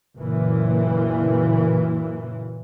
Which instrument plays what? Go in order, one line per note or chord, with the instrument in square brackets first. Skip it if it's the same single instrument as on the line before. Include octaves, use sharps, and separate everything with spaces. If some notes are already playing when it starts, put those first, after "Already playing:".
[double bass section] F#1 A#2 E3